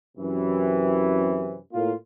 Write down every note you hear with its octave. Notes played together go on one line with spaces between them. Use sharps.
F#2 C3 E3
A2 A#3 F4